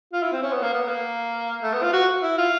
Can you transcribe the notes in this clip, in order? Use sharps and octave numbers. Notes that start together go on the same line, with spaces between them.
F4
E4
C4
C#4
B3
A#3
B3
A#3
A3
B3
F4
F#4
E4
F4